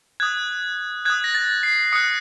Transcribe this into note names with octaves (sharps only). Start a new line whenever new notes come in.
D#6 F#6 G#6
D#6 F#6 G#6
A#6
A6
C7
D#6 F#6 C#7